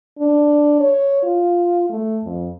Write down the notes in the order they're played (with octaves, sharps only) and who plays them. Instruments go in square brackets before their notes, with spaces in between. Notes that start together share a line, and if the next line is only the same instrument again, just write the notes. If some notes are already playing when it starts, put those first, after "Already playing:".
[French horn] D4
C#5
F4
A3
F2